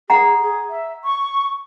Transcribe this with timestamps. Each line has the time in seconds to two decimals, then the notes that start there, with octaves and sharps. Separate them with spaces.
0.10 G#4 F#5 A#5
0.42 G#4
0.70 E5
1.04 C#6